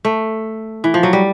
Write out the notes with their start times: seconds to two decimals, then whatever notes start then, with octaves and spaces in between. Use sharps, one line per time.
0.05 A3
0.84 E3
0.94 F3
1.03 F#3
1.13 G3